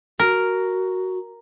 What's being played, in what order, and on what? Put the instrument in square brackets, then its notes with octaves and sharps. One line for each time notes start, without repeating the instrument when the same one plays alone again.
[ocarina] F#4 [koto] A#4